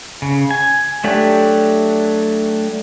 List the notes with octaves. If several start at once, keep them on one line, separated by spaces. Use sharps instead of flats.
C#3
G#5
F#3 A3 D4 G4